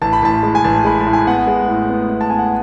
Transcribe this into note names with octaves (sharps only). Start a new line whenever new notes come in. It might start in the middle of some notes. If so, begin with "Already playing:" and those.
A1 A5
B5
A1 A5
G#3
G#5
A1 A5
G#3 B5
A5
A2
G#5
B3 F#5
G#3
A2
B3
B3
A5
B3 G#5
F#5